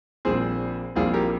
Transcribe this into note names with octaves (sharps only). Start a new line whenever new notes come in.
A#1 A#2 G3 C4 G#4 C5
A#1 A#2 G3 C4 F4 G#4
G4 A#4